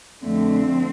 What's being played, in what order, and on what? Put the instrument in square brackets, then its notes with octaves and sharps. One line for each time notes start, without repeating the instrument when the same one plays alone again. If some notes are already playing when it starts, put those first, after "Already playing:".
[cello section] F2 D3 A3 C4